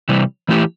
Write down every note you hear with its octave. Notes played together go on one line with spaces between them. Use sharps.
C3 E3 G3
E3 A3 E4 G4